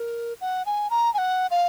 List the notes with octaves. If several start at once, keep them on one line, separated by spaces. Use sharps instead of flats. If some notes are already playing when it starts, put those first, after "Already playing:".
Already playing: A#4
F#5
G#5
A#5
G#5
F#5
F5